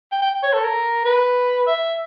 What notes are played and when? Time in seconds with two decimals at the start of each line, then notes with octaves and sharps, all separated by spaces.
0.12 G5
0.22 G5
0.43 C#5
0.53 A4
0.64 A#4
1.05 B4
1.67 E5